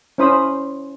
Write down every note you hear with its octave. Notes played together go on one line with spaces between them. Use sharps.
C#4 E4 C5 B5 D#6